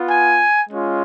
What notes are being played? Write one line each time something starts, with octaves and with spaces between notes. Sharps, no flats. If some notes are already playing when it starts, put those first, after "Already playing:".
Already playing: B3 F4
G#5
G#3 C#4 F4